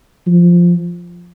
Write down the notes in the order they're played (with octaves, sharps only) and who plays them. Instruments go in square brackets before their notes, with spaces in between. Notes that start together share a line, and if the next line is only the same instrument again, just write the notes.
[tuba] F3